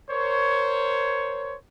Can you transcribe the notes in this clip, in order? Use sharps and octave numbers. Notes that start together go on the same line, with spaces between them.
A#4 C5 C#5